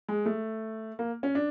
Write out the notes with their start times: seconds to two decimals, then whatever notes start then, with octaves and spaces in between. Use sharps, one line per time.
0.08 G#3
0.26 A3
0.99 A#3
1.23 C#4
1.35 D4